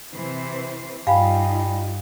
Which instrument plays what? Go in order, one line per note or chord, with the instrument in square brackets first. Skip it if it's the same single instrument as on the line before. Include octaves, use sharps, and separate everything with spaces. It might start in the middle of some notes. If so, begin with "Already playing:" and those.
[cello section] C3 E3 C5
[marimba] G2 [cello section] G3 D#4 F4 [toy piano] F5 [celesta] G5 G#5 B5